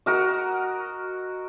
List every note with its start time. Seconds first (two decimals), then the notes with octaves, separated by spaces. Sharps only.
0.06 F#4 A#4 D#5